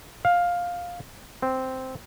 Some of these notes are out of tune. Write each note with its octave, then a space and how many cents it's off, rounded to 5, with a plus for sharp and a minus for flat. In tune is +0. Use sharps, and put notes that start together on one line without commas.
F5 +10
C4 -5